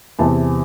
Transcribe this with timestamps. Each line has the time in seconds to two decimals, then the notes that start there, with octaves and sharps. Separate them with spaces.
0.19 E2 C3 E3 A5